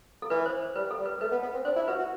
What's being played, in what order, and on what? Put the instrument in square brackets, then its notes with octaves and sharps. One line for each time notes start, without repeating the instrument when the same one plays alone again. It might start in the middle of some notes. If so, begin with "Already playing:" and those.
[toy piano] A4
[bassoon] E3 [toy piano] B4
[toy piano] C5
[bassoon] G3 [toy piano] B4
[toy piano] A4
[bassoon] G3
[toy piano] B4
[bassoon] A3 [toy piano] B4
[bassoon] B3
B3
C4
[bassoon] D4 [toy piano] C5
[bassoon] E4
[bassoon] F#4 [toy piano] B4
[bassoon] F#4